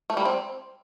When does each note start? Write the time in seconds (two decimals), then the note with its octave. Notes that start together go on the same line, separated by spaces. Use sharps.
0.10 A3
0.17 G3
0.25 C4